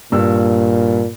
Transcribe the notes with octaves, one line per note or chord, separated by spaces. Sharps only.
G2 A#2 E6